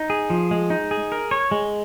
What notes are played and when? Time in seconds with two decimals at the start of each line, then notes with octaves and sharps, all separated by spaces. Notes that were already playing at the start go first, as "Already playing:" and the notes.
Already playing: D#4
0.10 G#4
0.30 F3
0.51 G#3
0.70 D#4
0.91 G#4
1.12 A#4
1.31 C#5
1.51 G#3